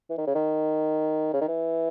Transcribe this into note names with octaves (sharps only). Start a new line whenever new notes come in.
E3
D#3
C#3
D#3
C#3
D#3
E3